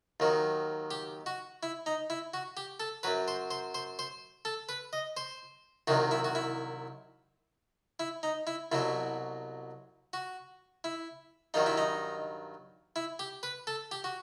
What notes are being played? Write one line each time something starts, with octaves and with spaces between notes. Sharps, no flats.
D#2 D#3 F#3
G4
F#4
E4
D#4
E4
F#4
G4
A4
F#2 F#3 B4
C5
C5
C5
C5
A4
B4
D#5
C5
C2 C3 D#3 F#3 F#4
E4
F#4
E4
E4
D#4
E4
C2 B2 F#3 E4
F#4
E4
G2 D#3 F#3 D#4
E4
D#4
E4
G4
B4
A4
G4
F#4